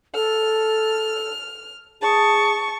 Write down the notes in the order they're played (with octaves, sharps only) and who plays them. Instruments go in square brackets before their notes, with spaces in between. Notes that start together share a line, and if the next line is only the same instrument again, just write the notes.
[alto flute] A4 [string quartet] F6
[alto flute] G#4 [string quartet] A5 C#6